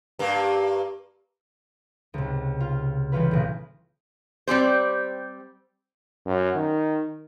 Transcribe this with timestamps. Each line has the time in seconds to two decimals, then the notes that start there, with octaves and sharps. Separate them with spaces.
0.19 G2 A#3
2.14 C#2 C3
2.60 F4
3.12 E3 G3 C#4 F4 B4
3.31 D#1 B1 F#6
4.47 G3 C4 G4 C5
6.26 F#2
6.55 D#3